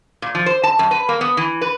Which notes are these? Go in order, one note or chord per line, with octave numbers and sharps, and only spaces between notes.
A#2
F3
C5
A5
F#2
B4
A#3
B3
E3
B4